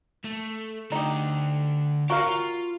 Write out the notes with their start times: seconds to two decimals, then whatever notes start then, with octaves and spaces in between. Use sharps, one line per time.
0.25 A3
0.92 D3 A3 D#4 G4
2.10 F#4 G4 A#4 C#5 F5
2.27 F4